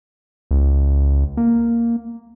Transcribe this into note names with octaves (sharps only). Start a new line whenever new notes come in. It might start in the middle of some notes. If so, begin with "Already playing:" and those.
C#2
A#3